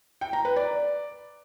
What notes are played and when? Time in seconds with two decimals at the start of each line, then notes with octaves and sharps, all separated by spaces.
0.21 G5
0.33 A#5
0.45 B4
0.56 D5